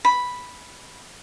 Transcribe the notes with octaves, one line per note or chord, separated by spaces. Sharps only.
B5